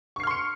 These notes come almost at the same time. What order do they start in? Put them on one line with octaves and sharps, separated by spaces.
C#6 C7 F6 C6 C#7